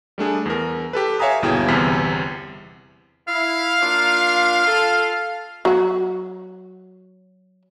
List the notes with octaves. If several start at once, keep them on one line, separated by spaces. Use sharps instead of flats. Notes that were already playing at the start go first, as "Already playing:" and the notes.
G3 A3 D4 G#4
E2 A#4
G4 A4 B4
C#5 E5 F5 G#5 A#5 D#6
G1 D#2 B2 E4 G#4 G5
G1 E2 C3 F6 B6
E4 F5
A#3 D4 F4
F4 A4
F#3 F#4